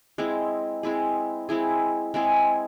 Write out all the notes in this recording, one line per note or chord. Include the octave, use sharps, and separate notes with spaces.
G#3 C4 E4 G#4
G#3 C4 E4 G#4
G#3 C4 E4 G#4
G#3 C4 E4 G#4